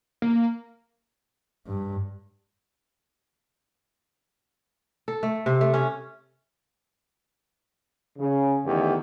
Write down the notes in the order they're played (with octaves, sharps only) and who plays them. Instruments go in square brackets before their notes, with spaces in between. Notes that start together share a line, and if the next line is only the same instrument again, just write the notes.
[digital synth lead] A#3
[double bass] G2
[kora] A4
A3
C3
A3
C#4
[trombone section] C#3
E2 D3 D#3 A3 G4